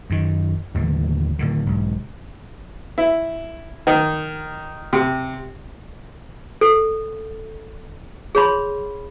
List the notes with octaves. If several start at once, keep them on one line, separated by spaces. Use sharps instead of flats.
F#2 D#3
D#2 A2 D3 E3
A2 D3 D#3
B1 G#2
E4
D#3
C3
A4
G#4 C#5 B5 C6